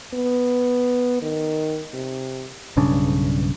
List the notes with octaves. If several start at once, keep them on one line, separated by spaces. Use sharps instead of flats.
B3
D#3
C3
B1 G2 C#3 D4